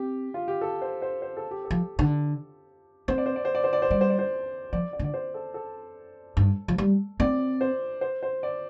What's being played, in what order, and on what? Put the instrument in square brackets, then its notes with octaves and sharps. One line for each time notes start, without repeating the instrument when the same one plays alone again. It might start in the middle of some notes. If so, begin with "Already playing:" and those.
Already playing: [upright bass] C4 [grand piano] G4
[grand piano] F4
G4
A4
C5
C5
C5
A4
G4
A4
[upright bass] F3
D3
[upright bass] C4 [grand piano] C5
[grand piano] D5
C5
D5
C5
D5
C5
D5
C5
[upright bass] G3 [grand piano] D5
[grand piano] C5
D5
C5
[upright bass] F3 [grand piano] D5
[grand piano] D5
[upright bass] D3
[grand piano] D5
C5
A4
A4
[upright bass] G2
F3
G3
[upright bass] C4 [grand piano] D5
[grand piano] C5
C5
C5
D5